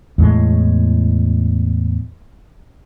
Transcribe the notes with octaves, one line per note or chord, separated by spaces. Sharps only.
E2 A2 G#3